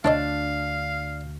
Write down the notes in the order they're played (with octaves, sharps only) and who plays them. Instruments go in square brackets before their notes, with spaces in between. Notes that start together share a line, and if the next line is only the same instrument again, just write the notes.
[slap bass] D2 [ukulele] D4 [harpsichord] E4 C#5 D#5 [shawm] F5